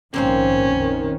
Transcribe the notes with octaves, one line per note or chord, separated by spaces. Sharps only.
A#1 G#2 D#3 A#3 C4 C#4 C5
F2 D#3